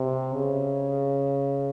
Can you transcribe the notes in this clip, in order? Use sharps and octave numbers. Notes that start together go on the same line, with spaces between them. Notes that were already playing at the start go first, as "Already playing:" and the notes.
Already playing: C3
C#3